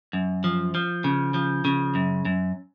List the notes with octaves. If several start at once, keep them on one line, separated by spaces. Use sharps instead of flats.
F#2
F3
F3
C#3
F3
C#3
F#2
F#2